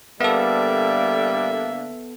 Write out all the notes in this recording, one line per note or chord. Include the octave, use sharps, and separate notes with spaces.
D3 G3 A#3 B3 A4 E5